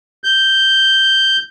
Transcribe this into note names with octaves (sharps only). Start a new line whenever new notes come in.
G6